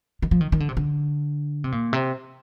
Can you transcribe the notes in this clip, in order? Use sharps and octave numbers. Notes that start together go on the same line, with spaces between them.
D#3
F3
D#3
D#3
D3
C3
D3
C3
A#2
C3